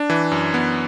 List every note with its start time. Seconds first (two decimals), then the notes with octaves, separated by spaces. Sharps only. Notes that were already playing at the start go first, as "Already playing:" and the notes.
Already playing: D4
0.10 E3
0.31 F#2
0.54 B3